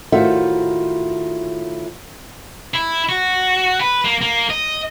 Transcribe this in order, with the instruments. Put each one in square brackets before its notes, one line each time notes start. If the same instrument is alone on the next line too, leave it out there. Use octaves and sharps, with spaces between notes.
[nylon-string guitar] A2 D#3 F4 F#4 C5 E5
[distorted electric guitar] E4
F#4
B4
A#3
A#3
D#5